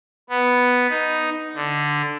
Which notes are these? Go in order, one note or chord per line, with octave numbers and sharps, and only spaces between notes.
B3
D#4
D3